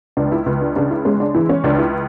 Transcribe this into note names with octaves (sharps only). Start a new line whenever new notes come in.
C#2 D4
E4
C#2
D4
C#3 D4
E4
G#3 C#4
D4
E3 E4
C#4
C#2 D4
E4